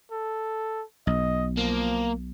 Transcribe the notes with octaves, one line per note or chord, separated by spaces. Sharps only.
A4
B1 D#5
F3 A#3